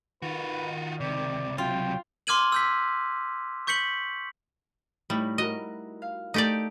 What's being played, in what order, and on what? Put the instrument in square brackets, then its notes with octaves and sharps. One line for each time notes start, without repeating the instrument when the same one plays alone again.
[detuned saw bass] D#3 [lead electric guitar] F4 F#4 [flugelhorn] B4
[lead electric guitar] C#2 C3 [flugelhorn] D5
[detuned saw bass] F#3 [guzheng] F4 [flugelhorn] G5
[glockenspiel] C6 D6 F6 G#6 D#7 F#7
E6 G6 B6
C#6 G6 B6 C#7 F#7
[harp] A2 D#4 E4 [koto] G3
[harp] F#4 A#4 [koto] D#5
[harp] F5
[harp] A3 A4 [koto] D#4 G4 D5